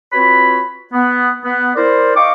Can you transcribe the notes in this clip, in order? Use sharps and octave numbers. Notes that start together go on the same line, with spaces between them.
C4 F4 F#4 B4 C#5 B5
B3
B3
E4 A#4 C5 D5
D#5 F5 G5 C#6 D6